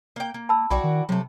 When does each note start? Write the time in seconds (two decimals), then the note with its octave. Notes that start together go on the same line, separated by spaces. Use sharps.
0.16 A#3 G5
0.34 A#3
0.49 A5 B5 E6
0.70 B1 E4 F#4 D5 G5 B5
0.84 D#3
1.09 C3 F#3 A3